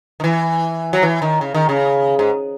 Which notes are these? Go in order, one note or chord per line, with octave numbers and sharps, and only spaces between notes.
D#3
E3
F#3
E3
D#3
C#3
D#3
C#3
G#2